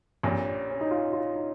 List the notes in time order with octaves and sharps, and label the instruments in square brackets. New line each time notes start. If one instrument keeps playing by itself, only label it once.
[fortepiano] A#1 A#2 G3 [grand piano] C#4
[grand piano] C#4
D#4
F4
F4
D#4